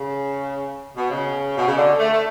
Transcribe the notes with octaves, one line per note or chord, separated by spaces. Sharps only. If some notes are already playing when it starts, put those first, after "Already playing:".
Already playing: C#3
B2
C#3
B2
C#3
D3
A3
A3